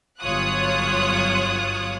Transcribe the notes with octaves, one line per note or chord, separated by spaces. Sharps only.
G1 F#3 F4 C#5 D#6 F#6